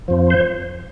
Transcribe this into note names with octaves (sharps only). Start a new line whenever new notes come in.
F2 F3
C5